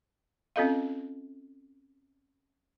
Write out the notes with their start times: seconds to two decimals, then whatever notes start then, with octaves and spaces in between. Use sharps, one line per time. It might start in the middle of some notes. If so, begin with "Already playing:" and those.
0.56 C4 C#4 F4 A4 D#5 F5